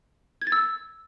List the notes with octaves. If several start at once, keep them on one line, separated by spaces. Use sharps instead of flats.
G#6
A6
E6